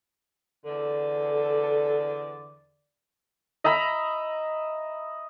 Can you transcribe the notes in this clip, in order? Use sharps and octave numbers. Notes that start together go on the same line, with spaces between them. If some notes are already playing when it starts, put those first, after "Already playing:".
E2 D3 A4 D5
D#5 E5 A#5 B5